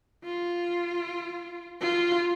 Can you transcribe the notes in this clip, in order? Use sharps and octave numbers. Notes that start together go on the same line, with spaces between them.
F4
F4